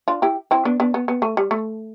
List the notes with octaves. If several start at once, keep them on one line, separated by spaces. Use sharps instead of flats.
D4 F4
E4 G4
C4 E4
B3 D4
B3 D4
B3
B3
A3
G3
A3